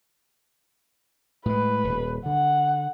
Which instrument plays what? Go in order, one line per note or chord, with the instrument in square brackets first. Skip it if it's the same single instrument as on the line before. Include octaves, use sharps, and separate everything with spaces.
[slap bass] A2 G#3 [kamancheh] B4
[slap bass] D#1
[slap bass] D3 [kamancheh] F#5